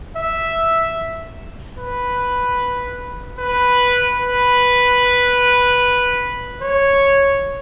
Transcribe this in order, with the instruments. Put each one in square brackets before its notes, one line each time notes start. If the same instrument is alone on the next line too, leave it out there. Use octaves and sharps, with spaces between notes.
[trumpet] E5
B4
B4
B4
C#5